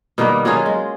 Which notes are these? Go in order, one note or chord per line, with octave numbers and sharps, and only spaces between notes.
B2 D#3 G3 A#3
F#3 C#4 F4 G#4
G#3